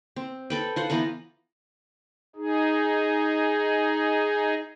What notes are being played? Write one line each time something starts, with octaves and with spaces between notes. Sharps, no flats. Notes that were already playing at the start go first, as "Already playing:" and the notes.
C4
A4 B4 G5
F4 C5 F#5
E3 B3 B4 A#5
D#4 G#4